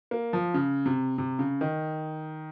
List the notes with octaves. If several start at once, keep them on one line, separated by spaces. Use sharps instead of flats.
A#3
F3
C#3
C3
C3
C#3
D#3